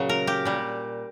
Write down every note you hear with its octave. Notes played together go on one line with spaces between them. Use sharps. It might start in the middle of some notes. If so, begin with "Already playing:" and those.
Already playing: A#2 C#3 F#3
A#4
G4
A#2 G3